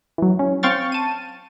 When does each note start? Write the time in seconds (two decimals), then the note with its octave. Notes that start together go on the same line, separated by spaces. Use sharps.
0.18 E3 F#3
0.39 C#4
0.63 C4 F5 G5 C#6 F6 A6
0.92 A5 D#7